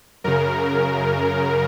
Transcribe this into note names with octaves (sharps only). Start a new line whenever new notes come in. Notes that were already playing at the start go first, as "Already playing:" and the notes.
F#2 C#3 A#4